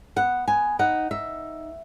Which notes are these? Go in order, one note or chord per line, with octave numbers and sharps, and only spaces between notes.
B3 F#5
B3 G#5
D#4 F#5
D#4 E5